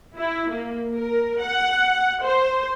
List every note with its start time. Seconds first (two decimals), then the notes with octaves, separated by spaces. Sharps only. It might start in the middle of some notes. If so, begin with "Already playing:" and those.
0.19 E4
0.52 A#3
0.95 A#4
1.41 F#5
2.24 C5